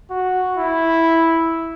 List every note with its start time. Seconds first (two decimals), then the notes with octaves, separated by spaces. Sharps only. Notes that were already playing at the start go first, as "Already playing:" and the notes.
0.10 F#4
0.57 E4